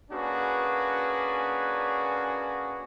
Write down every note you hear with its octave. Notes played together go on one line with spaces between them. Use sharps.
A#3 C#4 D4 F#4 G#4 B4